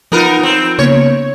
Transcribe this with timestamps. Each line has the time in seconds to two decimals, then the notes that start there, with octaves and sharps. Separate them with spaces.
0.12 F3 B3 D#4 F4 A#4
0.43 C4
0.79 C#3 A#3 B3 C#5